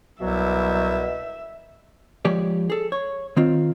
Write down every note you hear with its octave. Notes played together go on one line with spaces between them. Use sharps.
C2 B2 F#3 E5
F3 G#3 G4 C#5 D5
G#4 A4
C#5
D#3 C4 F4